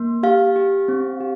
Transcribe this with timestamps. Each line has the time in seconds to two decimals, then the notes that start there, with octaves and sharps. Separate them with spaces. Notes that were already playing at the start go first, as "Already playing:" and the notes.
Already playing: A#3
0.23 G4 F5
0.56 G4
0.88 C4
1.20 G4